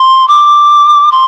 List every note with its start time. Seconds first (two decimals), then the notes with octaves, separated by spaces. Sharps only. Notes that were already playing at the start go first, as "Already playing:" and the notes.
Already playing: C6
0.28 D6
1.12 C6